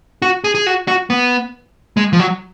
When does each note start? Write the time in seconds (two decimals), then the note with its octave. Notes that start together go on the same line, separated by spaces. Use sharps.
0.22 F#4
0.44 G#4
0.55 G#4
0.67 F#4
0.88 F#4
1.10 B3
1.97 G#3
2.13 F3
2.20 F#3